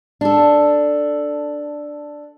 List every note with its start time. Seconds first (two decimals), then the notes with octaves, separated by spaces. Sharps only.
0.21 D4 A4